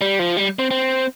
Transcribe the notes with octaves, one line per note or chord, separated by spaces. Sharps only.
G3
F3
G3
C4
C4